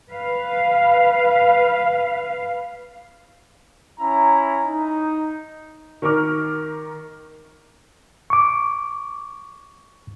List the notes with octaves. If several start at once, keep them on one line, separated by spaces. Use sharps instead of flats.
B4 F5
C#4 E4 A#5
D#4
D#3 A#4 C#6 D6 F6
C#6 D6